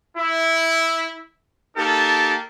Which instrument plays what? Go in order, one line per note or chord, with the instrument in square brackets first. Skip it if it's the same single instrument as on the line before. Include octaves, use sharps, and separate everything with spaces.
[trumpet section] E4
A#3 D#4 G4 A4 A5